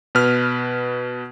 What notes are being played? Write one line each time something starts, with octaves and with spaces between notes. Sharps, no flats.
B2 B4 F6